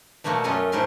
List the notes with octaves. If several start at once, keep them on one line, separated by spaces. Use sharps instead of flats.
B2 G3 A3 A#3 F#4
F#2 A3 C#4 F4 D#5 G#5
G#2 A3 E4 A#4 C6